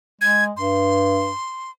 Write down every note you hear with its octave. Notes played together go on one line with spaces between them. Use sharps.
G#3 G#6
G2 C6